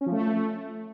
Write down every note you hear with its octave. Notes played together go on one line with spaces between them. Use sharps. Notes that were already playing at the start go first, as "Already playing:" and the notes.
C#4
F3
A3